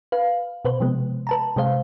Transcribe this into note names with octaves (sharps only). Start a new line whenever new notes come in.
B4 F5
B2 B4 C5
C3 F3 G#3 B3
B4 A5 A#5
C3 G#3 C5 F5